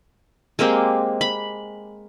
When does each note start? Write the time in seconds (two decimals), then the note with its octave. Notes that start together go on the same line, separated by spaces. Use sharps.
0.59 G#3 A#3 C4 G4
1.21 B5